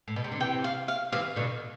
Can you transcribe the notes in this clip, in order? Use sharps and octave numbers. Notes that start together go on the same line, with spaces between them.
A2
B2
C3
D3
C3 E3 G5
F5
F5
C3 E3 F5
B2 D3